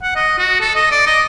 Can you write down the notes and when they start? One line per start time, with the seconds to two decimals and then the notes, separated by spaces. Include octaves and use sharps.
0.02 F#5
0.16 D#5
0.38 F#4
0.61 A4
0.75 D#5
0.91 D5
1.06 D#5